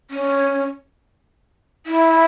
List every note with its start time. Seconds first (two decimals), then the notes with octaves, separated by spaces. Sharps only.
0.11 C#4
1.86 E4